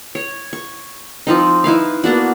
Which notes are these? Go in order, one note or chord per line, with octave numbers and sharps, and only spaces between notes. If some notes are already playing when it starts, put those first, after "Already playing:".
C#5
C#6
F3 C4 D#4
D#4 E4 B4 F5
A#3 B3 D4 F#4